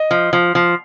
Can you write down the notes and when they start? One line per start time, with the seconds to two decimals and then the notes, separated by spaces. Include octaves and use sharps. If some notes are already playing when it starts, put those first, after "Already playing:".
Already playing: D#5
0.11 F3
0.33 F3
0.55 F3